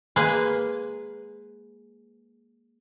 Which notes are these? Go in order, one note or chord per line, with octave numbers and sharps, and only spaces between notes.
G#3 A#3 G#4 B4